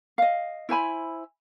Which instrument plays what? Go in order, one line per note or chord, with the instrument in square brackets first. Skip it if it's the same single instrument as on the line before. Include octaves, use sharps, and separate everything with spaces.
[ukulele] D#5 F5
E4 C5 G#5 B5